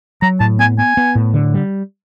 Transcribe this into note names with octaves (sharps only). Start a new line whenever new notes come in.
F#3 A#5
A2 A5
B3 G#5
B3 G#5
B3
A2
D3
G3